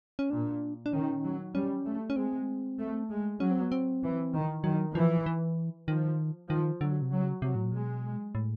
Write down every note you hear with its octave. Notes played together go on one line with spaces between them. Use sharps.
C#4
A#2 D4
D4
D#3 C#4
F#3
G3 C#4
A3
C#4
G#3 C4
A3
G#3
F#3 C#4
C4
B3
C4
E3
D#3
D#3 F#3
E3 F3
E3
D#3 F3
D#3 F3
D3 F#3
C3
C#3 F#3
C3 F#3
A2
A#2
B2 G#3
A2